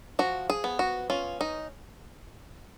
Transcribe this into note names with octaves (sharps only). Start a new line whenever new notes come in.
F3 F#4
G#4
B3
F#4
C#4 F4
D#4